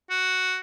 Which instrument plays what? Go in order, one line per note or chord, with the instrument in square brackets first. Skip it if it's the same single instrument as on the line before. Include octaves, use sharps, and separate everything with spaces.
[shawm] F#4